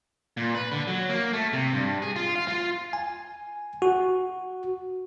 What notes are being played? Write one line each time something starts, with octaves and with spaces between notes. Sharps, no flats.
A#2
B4
D3
F#3
A#3
A3
C3
G2
G#4
F4
F5
F4
G#5
F#4